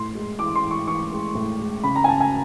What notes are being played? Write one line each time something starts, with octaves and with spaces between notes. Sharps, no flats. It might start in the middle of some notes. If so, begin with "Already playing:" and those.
Already playing: A2 C6
G#3
E3 D6
C6
E3
C#6
E3 C#6
G#3
A2
G#3
C#3 B5
A#5
G#5
C#3 A5
G#5